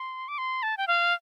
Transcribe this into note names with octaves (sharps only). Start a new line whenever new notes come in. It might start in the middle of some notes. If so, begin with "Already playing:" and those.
Already playing: C6
D6
C6
A5
G5
F5